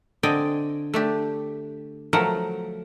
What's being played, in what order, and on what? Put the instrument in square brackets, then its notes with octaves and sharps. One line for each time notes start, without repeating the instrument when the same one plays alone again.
[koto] D3 C4 D5 D#5 G5 G#5
A3 D4 G4
F3 F#3 A3 A#4 F#5